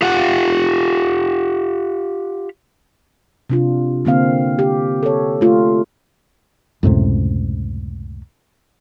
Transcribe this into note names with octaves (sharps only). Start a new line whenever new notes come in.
F4 G4 F#5
C3 D4 F4
D3 A#3 C4 F5
G4
A4 C#5
A3 F4
C#2 F#2 A2 C3